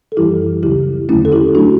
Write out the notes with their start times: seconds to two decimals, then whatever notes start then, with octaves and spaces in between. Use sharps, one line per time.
0.12 A4
0.17 F#2 E3 G3 E4 G4
0.63 D2 C#3 F#3 E4 G4
1.09 E2 D3 F#3 A3 C#4 E4
1.25 A4
1.32 E4 G4
1.55 F#3 A3 D4 F#4